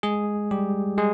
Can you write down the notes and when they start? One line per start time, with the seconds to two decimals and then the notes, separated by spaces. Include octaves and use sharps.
0.03 G#3 G#4
0.51 G3 G4
0.98 G#3 G#4